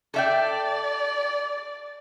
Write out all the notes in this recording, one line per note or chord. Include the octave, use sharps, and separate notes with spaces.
A4 D5 E5 G5